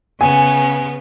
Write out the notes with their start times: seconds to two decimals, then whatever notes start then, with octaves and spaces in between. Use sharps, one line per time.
0.21 C#3 B3 G#5